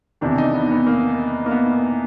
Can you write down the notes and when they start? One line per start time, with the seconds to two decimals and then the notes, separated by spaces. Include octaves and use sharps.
0.21 E2 C3 D#3 D4
0.38 D#4
0.54 B3
0.71 B3
0.87 A#3
1.46 A#3
1.51 B3